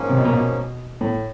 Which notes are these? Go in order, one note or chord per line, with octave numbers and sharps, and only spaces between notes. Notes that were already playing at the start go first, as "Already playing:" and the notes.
Already playing: G#2 F3 A#3 C#4
C3
B2
A#2
B2
A2